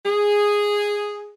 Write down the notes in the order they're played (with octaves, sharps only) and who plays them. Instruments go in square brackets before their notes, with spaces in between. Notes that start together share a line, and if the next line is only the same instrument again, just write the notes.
[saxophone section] G#4